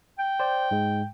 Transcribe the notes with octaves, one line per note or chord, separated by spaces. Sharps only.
G5
C5 D5
G#2 G#3